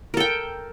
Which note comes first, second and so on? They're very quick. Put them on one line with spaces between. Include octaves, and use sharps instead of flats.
A#4 A4 G5